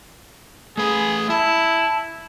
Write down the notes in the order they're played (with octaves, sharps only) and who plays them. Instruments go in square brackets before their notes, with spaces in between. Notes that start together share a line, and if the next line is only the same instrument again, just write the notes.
[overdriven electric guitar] A3 B4 [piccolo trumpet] G#4
[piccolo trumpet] E4 [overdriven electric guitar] A5